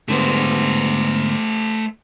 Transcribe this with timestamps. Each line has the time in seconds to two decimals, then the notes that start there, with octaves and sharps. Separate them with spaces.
0.08 G#2 D3 A3 B3 C5